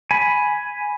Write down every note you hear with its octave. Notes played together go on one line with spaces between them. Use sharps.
G#5 B5